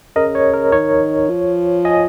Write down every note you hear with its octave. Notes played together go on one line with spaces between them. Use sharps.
C#3 A#4 D#5
C#5
A#4
D#3 C#5
F3
D#5 G#5